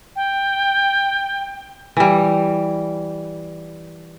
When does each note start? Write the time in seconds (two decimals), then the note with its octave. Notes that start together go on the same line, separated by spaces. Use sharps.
0.16 G5
1.97 E3 G3